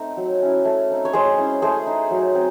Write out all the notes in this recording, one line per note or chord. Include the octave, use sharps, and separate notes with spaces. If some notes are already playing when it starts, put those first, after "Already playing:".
Already playing: A3 C4 D#4
F#3
C#4 E4
A3
C4 D#4
C#5
G#3 G#4 C5
C#4 E4
A3 G#4 C5
D#4
F#3
C4